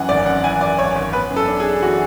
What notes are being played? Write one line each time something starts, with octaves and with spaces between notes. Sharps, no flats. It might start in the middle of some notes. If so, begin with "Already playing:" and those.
Already playing: F#2 E3 F#5
G#1 D5
F#2 F#5
E3 G#5
F#2 D5
G#1 C#5
G#1 C#5
B3 B4
F#2
A4
D4
G#4
D4
E3 F#4